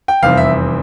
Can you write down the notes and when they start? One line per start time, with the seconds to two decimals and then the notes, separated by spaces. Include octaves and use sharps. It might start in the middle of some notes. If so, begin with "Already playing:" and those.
0.08 G5
0.22 F1 E2 C3 G3 C4 F5
0.37 E5